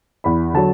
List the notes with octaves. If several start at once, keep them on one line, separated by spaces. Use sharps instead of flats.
E2 B5
D3 F#3 A5